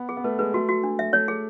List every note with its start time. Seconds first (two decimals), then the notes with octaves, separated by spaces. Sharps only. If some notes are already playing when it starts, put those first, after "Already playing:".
Already playing: B3
0.09 G#4
0.17 B3
0.24 A3 B4
0.39 G#3 B4
0.54 A3 F#4
0.69 F#4
0.83 D4
0.99 E5
1.13 A3 C#5
1.28 G#4